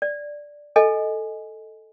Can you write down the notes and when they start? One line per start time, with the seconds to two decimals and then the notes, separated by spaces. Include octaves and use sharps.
0.02 D5
0.76 A4 D#5 G#5